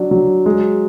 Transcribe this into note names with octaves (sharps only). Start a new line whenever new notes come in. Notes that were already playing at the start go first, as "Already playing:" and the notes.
Already playing: F#3 D4
F#3
G#3